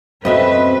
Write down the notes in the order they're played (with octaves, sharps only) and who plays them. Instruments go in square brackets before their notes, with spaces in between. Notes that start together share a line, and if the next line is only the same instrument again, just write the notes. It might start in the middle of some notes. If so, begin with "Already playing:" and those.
[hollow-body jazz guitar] F#2 B2 A3 [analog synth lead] C4 [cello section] B4 [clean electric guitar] D#5 E5